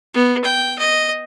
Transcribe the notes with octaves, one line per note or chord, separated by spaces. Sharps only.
B3
G5
D#5